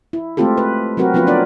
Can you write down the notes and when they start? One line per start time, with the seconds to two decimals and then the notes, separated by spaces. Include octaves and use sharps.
0.13 E4
0.37 G#3 A3 C4 F4 G4 A4
0.58 B4
0.97 F#3 C4 F#4 A#4 B4
1.14 F3 B3 C#4 F4 B4
1.27 C#4 D4 A#4 C#5 D5